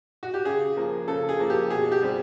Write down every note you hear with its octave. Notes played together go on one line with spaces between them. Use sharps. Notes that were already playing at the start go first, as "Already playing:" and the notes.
F#4
G4
C#3 G#4
F3 A#3
C#3 A4
G#4
F3 A#3
G4
B2 G#4
G4
G3 C4